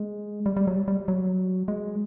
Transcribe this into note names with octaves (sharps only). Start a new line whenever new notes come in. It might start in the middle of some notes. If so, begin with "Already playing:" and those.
Already playing: G#3
G3
G3
F#3
G3
G3
F#3
G#3